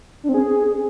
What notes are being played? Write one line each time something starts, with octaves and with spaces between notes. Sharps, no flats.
D4
C4
G#4